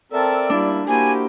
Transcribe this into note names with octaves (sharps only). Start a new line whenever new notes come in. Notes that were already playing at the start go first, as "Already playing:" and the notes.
C4 A4 A#4 D5 E5 A5
G3 A#3 D4 E4
A#3 E4 F#4 G4 C5 G#5